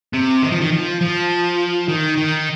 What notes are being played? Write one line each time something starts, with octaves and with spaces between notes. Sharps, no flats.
C3
D#3
F3
D#3
F3
F3
D#3
D#3